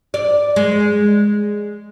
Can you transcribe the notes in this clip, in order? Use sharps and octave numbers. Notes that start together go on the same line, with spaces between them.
D5
G#3